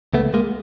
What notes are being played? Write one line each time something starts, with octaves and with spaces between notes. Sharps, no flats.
C#2 A3 B3
G#3 A#3